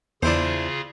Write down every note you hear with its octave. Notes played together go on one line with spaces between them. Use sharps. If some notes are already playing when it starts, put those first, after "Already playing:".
E2 C#3 D4 E4 F4 G#4 C5